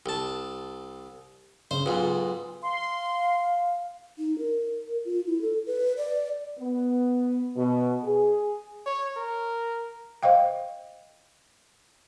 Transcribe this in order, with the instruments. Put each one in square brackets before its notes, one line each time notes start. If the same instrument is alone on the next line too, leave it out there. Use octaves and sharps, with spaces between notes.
[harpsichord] C2 A5
[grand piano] C#3 [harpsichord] C5
[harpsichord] B1 G#2 [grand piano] F4 B4
[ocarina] F5 [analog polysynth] C6
[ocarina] D#4
A#4
F4
E4
A4
B4
D5
[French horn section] B3
B2
G#4
[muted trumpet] C#5
A#4
[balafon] C5 D#5 F5 G5